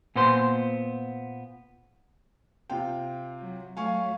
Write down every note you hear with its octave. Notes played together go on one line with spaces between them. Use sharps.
A#2 B3 C5 C6
C3 F4 G5
F#3
F#3 A3 F5 G#5 C#6